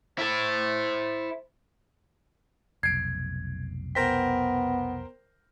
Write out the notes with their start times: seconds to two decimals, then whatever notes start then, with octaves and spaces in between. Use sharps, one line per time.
0.18 E4 A4 C5
2.83 F1 B1 G#6 C7 D7
3.95 B3 A#4 C5 G5 A#6 B6